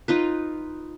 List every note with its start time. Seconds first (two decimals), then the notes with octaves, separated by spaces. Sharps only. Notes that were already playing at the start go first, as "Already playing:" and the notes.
0.08 D#4 F4 B4